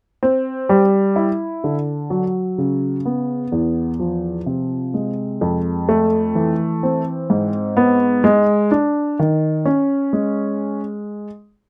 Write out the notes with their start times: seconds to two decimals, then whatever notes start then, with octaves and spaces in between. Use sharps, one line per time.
0.23 C4
0.69 G3
1.16 E4
1.64 D3
2.10 F#3
2.58 C#3
3.05 B3
3.52 E2
4.00 F3
4.46 C3
4.94 G#3
5.41 F2
5.89 A3
6.35 E3
6.83 C4
7.30 G#2
7.77 B3
8.24 G#3
8.71 D4
9.19 D#3
9.65 C#4
10.13 G#3